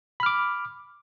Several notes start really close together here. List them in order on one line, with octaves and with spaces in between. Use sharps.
B5 F6 D6